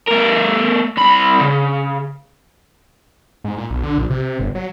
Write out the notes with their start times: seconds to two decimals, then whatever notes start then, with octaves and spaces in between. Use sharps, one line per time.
0.07 A3 A#4
0.97 C2 B5
1.41 C#3
3.44 G#2
3.58 A#2
3.70 B1
3.83 D3
3.98 A#1
4.10 C3
4.39 G1
4.55 F#3